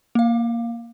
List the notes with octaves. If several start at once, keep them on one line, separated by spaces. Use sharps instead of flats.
A#3 F5